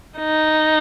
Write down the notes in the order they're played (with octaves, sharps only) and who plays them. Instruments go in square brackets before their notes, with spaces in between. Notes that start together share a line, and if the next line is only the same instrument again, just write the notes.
[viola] D#4